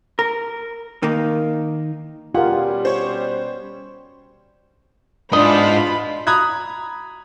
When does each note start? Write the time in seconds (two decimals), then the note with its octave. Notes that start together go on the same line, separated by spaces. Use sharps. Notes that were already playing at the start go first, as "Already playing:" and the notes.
0.19 A#4
1.03 D#3 A#3
2.35 B2 G3 C#4 F4 G4 G#4 A#4 F#5
2.85 C5 C#5
5.33 E2 G#2 D4 D#4 F4 D#5 B5
6.27 A#5 B5 D#6 F#6 G#6